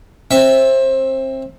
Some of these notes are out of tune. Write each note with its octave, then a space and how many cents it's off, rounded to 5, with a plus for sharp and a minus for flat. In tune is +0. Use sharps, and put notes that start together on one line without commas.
C4 +25 E5 -5